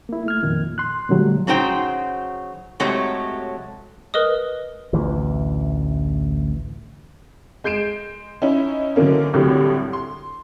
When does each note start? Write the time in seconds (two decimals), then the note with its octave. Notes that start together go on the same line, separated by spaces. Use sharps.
0.09 A#3 E4
0.26 A3 F6 G#6
0.43 F2 A#2 D#3
0.78 C6 F#6
1.09 A#2 D3 F#3 G3 A3
1.47 C#3 F#3 D#4 C5 G5
2.80 A2 C3 F#3 G#3 G4 C#5
4.14 A#4 B4 D#5 D#6
4.93 A1 D2 E3
7.64 G#3 G6 C7 D7 E7
8.42 C#4 D#4 E4
8.96 D3 E3 F#3 A#3 C#4
9.33 C2 A2 D3 F#3 G3 C4
9.93 C6